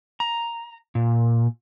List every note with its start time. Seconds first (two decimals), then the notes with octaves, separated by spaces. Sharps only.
0.20 A#5
0.95 A#2